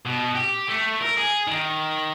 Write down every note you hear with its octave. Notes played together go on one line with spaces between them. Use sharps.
B2
G4
A3
A#4
G#4
D#3